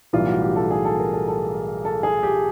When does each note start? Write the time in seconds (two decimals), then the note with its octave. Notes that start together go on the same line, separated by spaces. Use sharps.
0.13 B1 A2 E3 G3 F4
0.27 F#4
0.41 G4
0.56 A4
0.71 G#4
0.85 A4
0.99 A#4
1.13 A4
1.28 A4
1.85 A4
2.03 G#4
2.23 G4